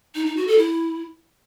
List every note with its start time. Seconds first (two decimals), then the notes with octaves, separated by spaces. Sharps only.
0.15 D#4
0.26 D#4
0.37 F#4
0.47 A4
0.58 E4